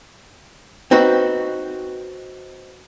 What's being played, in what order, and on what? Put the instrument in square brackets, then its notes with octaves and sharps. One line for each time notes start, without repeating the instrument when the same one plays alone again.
[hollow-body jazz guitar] C4 D#4 F#4 B4